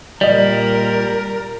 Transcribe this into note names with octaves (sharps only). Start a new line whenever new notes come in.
A#2 G3 A#4 D5 D#5